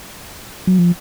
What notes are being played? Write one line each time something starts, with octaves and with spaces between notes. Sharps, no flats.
F#3
F3